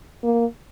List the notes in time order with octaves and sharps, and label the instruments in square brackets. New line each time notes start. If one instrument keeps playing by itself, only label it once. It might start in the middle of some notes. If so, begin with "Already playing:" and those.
[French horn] A#3